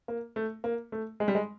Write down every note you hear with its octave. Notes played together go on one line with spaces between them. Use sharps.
A#3
A3
A#3
A3
G#3
G3
G#3